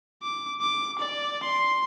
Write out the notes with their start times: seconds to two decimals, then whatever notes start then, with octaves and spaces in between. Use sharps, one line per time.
0.23 D6
0.61 D6
0.99 D5
1.43 C6